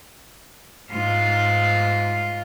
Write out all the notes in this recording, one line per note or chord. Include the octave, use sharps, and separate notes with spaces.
G#2 F4